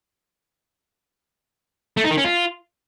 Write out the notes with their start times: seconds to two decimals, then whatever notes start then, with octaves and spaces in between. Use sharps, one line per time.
1.97 A3
2.04 D#4
2.11 D#3
2.17 C#4
2.24 F4